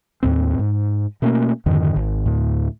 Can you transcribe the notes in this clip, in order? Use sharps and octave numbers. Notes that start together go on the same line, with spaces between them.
D#2 A2 C4
G#2
B2 A3 A#3 C#4
F2 G#2 D3 D#3
G#1
D2 A2